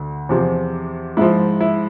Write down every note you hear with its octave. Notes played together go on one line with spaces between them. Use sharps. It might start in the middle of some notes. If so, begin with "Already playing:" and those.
Already playing: D2 D3
E2 C3 F3
G#2 F3 E4
E4